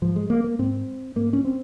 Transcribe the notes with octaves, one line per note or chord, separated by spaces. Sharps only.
G#2 F3
G#3
A#3
A#3
G#2 C4
G#2 A#3
C#4
C4